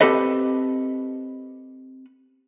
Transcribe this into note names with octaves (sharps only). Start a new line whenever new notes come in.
C4 G4 A4 B4 D#5